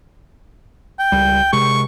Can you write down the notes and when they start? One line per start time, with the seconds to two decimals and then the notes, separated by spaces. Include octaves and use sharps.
0.99 G5
1.12 C#2 G3
1.53 C3 G#3 C#6